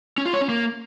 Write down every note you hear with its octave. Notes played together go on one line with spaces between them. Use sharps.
C#4
F4
C#5
C#4
A#3